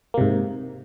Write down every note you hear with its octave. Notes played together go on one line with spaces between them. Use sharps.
G#2 C3 A#3